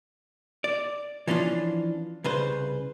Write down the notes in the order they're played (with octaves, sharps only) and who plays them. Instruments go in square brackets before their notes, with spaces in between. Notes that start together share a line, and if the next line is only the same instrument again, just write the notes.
[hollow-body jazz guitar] D5
E3 F3 C#4 D4 F4
C2 C#3 B4 C5